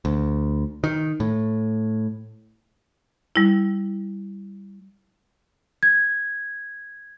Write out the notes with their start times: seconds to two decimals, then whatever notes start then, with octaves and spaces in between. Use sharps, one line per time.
0.05 D2
0.84 D#3
1.20 A2
3.36 G3 E4
5.83 G#6